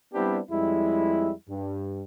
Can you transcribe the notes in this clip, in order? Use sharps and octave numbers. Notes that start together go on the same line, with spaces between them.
G3 B3 C4 D4 E4 G4
F2 G3 G#3 E4
G2